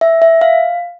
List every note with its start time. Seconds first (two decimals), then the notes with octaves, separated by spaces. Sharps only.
0.01 E5
0.22 E5
0.41 F5